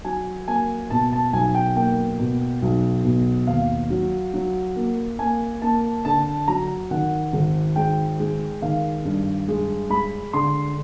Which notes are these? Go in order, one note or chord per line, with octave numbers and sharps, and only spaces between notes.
F#3 G#5
A#3 G#5
B2 A5
A5
B1 G#5
G5
A#3 G5
B2
B1
B2
D#2 F5
F#3
F#3
A#3
A#3 G#5
A#3 A5
D3 A5
F#3 A#5
D#3 F#5
G#1
G#3 G5
G#3
D#3 F5
G2
G#3
G#3 B5
D3 C6